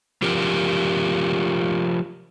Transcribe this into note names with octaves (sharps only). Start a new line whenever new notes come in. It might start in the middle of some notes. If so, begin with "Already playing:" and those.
F3 F4 G4 A#4